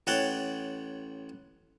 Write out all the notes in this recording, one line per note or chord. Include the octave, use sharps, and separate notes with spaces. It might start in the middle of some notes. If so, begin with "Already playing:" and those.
A1 C#5 F#5 G5 A5